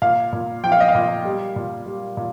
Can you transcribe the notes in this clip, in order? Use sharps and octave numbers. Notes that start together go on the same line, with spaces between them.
A#2 F5
A#2
F3 G5
F5
D#5
F5
A#2
G3
A#2
G3
A#2